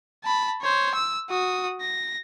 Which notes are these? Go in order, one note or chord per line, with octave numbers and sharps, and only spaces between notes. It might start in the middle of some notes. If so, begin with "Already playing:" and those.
A5 B5
C5 C#5
E6
F#4 D#6
A#6